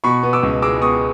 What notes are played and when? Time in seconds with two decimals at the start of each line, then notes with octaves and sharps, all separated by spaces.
0.04 B2 B5 C#6
0.23 B3
0.33 D6 E6
0.43 C#2
0.62 G#3 D6 E6
0.82 B3 C#6 D#6